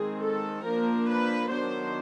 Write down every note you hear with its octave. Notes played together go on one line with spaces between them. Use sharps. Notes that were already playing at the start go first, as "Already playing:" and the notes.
Already playing: D#3 G#3 C4 G#4
A4
F3 A#3 D4 A#4
B4
D#3 F#3 B3 D4 C5